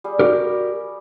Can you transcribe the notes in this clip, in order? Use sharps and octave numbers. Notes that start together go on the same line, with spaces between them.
G3 G#4
F#4 G4 A#4